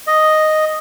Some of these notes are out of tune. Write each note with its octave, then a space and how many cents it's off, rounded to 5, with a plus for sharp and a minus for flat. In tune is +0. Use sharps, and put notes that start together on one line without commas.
D#5 +0